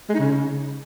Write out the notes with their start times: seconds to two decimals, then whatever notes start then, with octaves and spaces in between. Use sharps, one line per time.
0.09 G#3
0.14 D#4
0.19 C#3